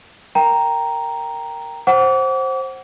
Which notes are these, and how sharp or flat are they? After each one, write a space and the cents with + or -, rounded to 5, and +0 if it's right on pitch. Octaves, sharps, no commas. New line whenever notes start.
A#4 -10 G5 +0 A#5 +0
C5 +15 F#5 +15 D6 -40